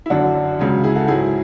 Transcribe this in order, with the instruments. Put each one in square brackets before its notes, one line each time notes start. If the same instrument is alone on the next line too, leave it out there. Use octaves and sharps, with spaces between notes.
[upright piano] E4
F#2 D3 F#3 D4 F#4
C#2 C#3 F#3
E4 G#4
F#4 A4
G#2 F#3 E4 G#4